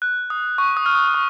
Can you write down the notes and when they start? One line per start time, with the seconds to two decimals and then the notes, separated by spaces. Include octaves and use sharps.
0.02 F#6
0.30 D#6
0.58 C#6
0.77 D#6
0.86 F6
0.95 D#6
1.07 D#6
1.14 C#6